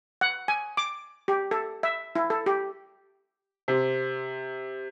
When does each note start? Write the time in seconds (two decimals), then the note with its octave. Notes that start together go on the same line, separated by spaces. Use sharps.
0.21 F#5
0.48 G#5
0.77 D6
1.28 G4
1.51 A4
1.83 E5
2.15 E4
2.30 A4
2.46 G4
3.68 C3